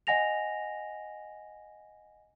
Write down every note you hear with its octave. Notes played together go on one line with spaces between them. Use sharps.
D#5 F#5 G#5 A#6 F7